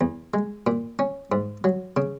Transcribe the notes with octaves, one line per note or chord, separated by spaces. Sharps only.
E2
G#3
A#2
C#4
G#2
F#3
C#3